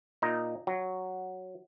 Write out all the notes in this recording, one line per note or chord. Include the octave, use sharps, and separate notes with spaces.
A#2 D#4 A#5
F#3